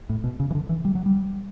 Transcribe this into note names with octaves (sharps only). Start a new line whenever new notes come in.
A2
B2
C#3
E3
D3
E3
G3
F#3
G3